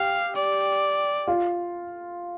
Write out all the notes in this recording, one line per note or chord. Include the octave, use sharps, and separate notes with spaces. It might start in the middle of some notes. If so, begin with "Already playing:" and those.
Already playing: G4 F5
D5
F4